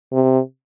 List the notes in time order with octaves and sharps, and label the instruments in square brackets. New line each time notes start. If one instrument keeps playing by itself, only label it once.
[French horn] C3